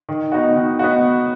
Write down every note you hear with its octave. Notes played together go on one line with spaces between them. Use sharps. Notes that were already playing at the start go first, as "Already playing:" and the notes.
D#3
B3 D#4 F#4
D#3
B3 D#4 F#4